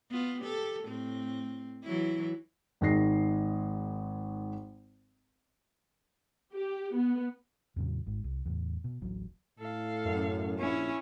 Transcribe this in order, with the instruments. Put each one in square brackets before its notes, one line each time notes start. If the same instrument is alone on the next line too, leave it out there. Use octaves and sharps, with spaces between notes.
[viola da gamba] B3 F4
G4 A4
A2 C4
E3 F#3 E4
[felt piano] G#1 D#3 G#3 A#6 C7
[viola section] G4
B3
[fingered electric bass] E2 A2 C#3 F#3
G#1 G#2
C2
E2 A2
B2
D1 A1 F#3
[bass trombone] A2 [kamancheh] A4 F5
[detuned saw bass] F#2
[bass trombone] A#1 [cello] C#4 E4